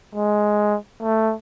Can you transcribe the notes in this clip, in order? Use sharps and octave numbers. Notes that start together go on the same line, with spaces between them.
G#3
A3